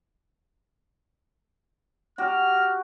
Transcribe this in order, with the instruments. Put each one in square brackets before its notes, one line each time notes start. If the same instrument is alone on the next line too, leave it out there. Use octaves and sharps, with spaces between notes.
[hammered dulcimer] F#4 G4 [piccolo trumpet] F6